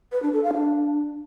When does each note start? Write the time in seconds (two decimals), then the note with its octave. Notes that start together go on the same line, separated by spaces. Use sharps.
0.12 B4
0.22 D4
0.33 A4
0.43 F5
0.54 D4